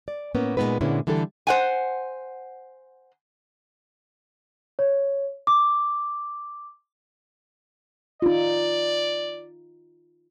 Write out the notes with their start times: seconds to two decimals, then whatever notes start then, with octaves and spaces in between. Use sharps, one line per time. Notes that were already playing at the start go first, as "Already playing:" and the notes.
0.08 D5
0.35 A2 A#3 B3 C#4
0.57 A#2 G#3 A3 B3 D#4 B4
0.81 A#2 D3 G#3 B3 C#4 E4
1.07 D3 E3 G3 G4 A4
1.47 C5 F#5 G#5
4.79 C#5
5.47 D6
8.22 D#4 F4 D5